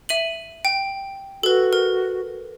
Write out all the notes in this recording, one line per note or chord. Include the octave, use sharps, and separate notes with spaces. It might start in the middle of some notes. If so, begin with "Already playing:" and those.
E5 D#7 F#7
G5
F#4 A4 B4
A#4